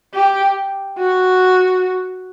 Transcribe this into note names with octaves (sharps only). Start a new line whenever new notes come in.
G4
F#4